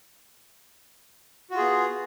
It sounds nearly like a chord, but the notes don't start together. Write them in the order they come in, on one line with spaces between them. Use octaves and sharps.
F#4 F4 G#4 B3